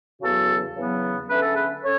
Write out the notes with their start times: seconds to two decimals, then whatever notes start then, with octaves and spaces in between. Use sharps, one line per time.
0.22 E2 C#3 F#3 B3 F#4 A4
0.76 E2 C#3 F#3 B3
1.29 D3 A3 C#4 B4
1.42 A4
1.54 G#4 B4
1.83 C#4 A4 C#5